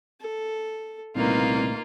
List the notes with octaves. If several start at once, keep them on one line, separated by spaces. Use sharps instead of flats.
A4
C2 A#2 C#3 A3 A#3 D#4 F4 B4